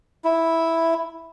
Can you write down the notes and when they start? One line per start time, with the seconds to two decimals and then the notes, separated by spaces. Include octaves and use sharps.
0.24 E4